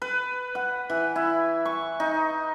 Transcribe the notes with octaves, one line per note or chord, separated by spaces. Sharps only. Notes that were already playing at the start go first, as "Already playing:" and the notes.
B4
F#5
E3
E4
C#6
D#4